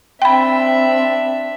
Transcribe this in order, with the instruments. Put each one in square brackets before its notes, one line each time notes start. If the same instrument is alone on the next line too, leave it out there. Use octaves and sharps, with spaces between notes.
[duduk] C4 [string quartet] D4 E5 [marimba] G5 B5